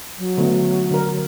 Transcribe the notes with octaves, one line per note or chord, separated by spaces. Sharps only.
F#3
D3 A3 B3
D3 A#4